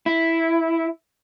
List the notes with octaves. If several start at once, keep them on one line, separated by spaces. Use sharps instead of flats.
E4